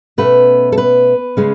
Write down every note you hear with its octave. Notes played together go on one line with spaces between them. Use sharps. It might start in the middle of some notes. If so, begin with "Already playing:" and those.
B2 A3 C#4 B4
A4
B4
C#3 G#3 C#4